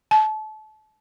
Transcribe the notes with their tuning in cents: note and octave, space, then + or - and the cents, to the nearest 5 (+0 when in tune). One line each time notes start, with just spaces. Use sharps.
A5 -30